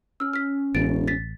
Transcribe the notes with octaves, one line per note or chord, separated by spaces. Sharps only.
C#4 E6 F6
F6 B6
E1 A1 A6 D7
A6 B6